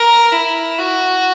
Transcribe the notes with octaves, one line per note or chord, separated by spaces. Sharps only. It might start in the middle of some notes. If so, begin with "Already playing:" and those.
Already playing: A#4
E4
F#4